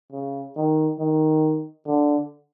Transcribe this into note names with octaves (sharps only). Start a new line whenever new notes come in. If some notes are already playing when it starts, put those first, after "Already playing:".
C#3
D#3
D#3
D3